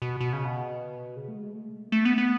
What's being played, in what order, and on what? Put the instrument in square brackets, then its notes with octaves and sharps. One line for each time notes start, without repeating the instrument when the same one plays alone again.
[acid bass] B2
B2
C#3
B2
C#3
A3
G#3
A3
A3
B3
B3